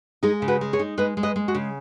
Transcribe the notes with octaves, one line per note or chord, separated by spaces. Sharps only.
G#3 D#4 G#4
C#3
F#4 B4
G#3
G#4 C#5
D#4
G#3 B4 D#5
G#3
B4 D#5
G#3
F#4
C#3